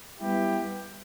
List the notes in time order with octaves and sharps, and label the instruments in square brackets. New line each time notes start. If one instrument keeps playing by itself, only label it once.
[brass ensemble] G3 B3 E4 G4